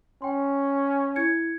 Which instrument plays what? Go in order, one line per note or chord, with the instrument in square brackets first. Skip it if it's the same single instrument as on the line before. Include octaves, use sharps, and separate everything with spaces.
[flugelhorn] C#4 [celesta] G5 C6
[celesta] E4 G#6 C#7